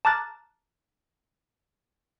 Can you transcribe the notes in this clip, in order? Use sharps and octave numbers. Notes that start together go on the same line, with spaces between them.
A5 A#5 D6 F6 F#6 A6